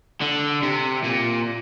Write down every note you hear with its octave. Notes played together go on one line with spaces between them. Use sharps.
D3
C3
A#2